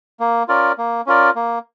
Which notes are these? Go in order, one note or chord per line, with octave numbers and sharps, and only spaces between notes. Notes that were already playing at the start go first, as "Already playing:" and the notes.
A#3
C#4 F4 A#4 D5
A#3
C#4 F4 A#4 D5
A#3